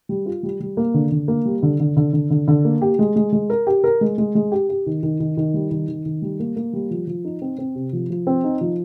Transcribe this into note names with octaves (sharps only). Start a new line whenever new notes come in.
G3
F4
G3
G3
A#3
D3
D3
A#3
G3
D3
D3
D3
D3
D3
D3
A#3
G4
G#3
G#3
G#3
A#4
G4
A#4
G#3
G#3
G#3
G4
G4
D#3
D#3
D#3
D#3
G3
D#3
D#3
D#3
G3
A#3
A#3
G3
F3
F3
D#4
C4
C4
C3
F3
F3
C4
D#4
F3